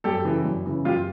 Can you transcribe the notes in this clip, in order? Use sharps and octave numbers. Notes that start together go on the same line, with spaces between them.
F#2 G4 A4
C#3 E3
F#2
C#3 E3
F#2 F4 G4